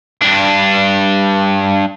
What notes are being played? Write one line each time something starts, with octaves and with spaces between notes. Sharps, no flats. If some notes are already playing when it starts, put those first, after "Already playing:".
G2 D4